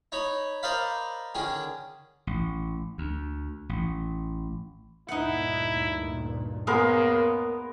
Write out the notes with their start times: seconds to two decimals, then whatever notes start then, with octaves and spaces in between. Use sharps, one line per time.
0.12 D#4 C#5 B5
0.63 A#4 C5 D5 D#5 F5 B5
1.35 D3 D#3 C#4 G#4
2.27 A1
2.98 D2
3.69 A1
5.08 D2 G2 A#2 D#4 E4 F#5
6.67 C#3 G#3 A#3 B3 A#4